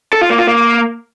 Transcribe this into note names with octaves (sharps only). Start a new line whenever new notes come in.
A4
F4
A#3
F4
A#3